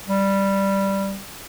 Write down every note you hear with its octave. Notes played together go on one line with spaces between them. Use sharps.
G3